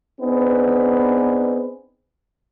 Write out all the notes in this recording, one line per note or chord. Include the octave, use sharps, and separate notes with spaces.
B3 C4 D4 D#4 G#4 B4